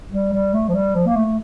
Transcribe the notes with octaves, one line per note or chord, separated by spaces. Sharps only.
G3
G3
A3
F3
G3
F3
A#3
A3